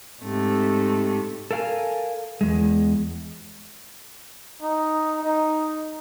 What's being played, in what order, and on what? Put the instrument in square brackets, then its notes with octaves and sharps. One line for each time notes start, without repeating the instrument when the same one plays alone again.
[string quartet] G#2 C3 A3
[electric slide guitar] A4 A#4 F5 F#5 G#5
E2 G#3
[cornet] D#4
D#4